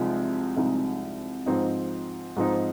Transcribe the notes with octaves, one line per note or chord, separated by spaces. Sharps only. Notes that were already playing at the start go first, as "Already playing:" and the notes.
Already playing: C2 C3 F3 G#3 D#4
C2 C3 F3 G#3 D#4
G#2 F3 C4 D#4
G#2 F3 C4 D#4